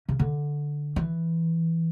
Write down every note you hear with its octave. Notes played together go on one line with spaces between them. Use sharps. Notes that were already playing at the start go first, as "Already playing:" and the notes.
C#3
D3
E3